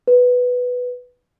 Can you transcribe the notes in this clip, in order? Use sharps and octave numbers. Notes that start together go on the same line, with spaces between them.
B4